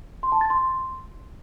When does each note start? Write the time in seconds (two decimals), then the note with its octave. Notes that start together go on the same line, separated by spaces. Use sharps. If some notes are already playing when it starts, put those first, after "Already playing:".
0.23 C6
0.32 A5
0.41 A6
0.50 C6